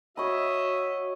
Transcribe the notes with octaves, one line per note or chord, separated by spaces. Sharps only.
F#4 C#5 D#5 E5 B5